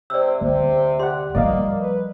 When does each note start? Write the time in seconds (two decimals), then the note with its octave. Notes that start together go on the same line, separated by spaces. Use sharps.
0.10 C3 D5 E6
0.41 D2 C3
0.99 G4 D5 F#5 C6
1.35 F3 G3 A#3 D5 D#5 F5
1.80 B4